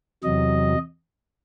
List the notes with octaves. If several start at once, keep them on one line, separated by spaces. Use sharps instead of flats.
E2 C3 F#3 D#5